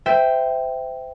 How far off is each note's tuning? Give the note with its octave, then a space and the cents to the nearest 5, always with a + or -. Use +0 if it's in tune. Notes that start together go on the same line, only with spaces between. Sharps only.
C5 -25 E5 +0 G5 +0